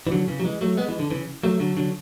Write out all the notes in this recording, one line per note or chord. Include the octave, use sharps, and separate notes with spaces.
E3
D3 F#3
C#3 E3
F#3
E3 G#3
F#3 A3
G#3 B3
E3 G#3
D3
C#3 E3
F#3 A3
D3 F#3
D3 F#3